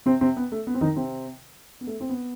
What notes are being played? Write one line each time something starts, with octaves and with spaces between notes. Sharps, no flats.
C3 C4
C3 C4
B3
A3
B3
C4
D#3 D#4
C3 C4
B3
A3
C4
B3